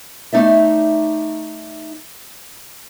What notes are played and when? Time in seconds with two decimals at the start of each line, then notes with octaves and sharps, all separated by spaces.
0.33 A3 D#4 D5 E5